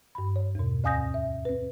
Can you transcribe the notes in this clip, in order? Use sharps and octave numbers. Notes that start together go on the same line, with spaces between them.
G2 B5
C#5
E2 B2
D2 F5 G#5 D#6 G6 A#6
E5
C4 B4